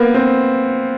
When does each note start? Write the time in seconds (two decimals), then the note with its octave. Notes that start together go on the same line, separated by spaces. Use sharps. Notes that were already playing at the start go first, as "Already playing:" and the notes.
Already playing: A#3 B3
0.14 C4